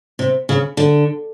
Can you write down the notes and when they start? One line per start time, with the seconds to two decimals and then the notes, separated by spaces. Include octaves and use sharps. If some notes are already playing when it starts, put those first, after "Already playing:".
0.19 C3
0.49 C#3
0.77 D3